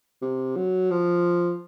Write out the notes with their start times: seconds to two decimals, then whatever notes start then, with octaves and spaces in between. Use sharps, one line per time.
0.22 C3
0.56 F#3
0.91 F3